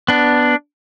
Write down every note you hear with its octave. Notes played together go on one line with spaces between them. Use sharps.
B3 D4